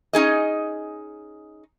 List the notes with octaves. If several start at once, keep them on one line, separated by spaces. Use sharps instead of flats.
C#4 D#4 G#4 D#5